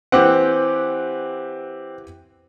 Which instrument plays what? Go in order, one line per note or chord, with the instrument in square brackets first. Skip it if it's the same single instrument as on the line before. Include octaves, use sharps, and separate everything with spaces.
[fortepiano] E3 G4 F#5 [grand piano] C4